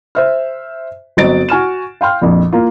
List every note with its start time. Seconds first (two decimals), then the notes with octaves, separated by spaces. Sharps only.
0.15 C5 E5 F6
1.17 G1 F#3 C4 D#5 A6 D7
1.49 F#4 G#5 F6 E7
2.01 F5 G5 C6 F6
2.22 A#1 F2
2.52 A#3 F4